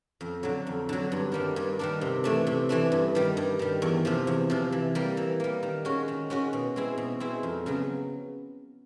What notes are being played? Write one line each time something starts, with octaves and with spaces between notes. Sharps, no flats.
F2
D3 F#3
F2
D3 F#3
G2
D#3 G3 A#3 D4
G2
D#3 G3 A#3 D4
C3
E3 A3 D4
C3
E3 A3 D4
G2
D#3 G3
G2
D#3 G3
E2
C3 F3
E2
C3 F3
E3
G3 A#3
E3
G3 A#3
D#3
G#3 C#4 F#4
D#3
G#3 C#4 F#4
B2
G#3 C4 E4
B2
G#3 C4 E4
F2
C#3 F#3 B3